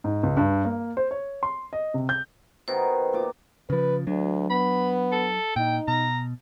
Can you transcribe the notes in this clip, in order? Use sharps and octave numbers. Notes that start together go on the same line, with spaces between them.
G#2
C#2
G2
A#3
C5
C#5
C6
D#5
C3
G6
B2 D#3 C5
A#2 D6
C#3 F3 B4
D2 F#3 D4
B3 B5
A4
A#2 D#4 G5
B2 A#5